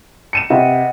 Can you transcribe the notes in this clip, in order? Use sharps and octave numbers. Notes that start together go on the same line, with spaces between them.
C#7 D#7 E7
C3 B4 D#5 F#5